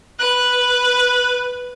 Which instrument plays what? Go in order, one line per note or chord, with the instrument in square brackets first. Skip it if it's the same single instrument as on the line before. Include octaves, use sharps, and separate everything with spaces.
[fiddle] B4 [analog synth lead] F#6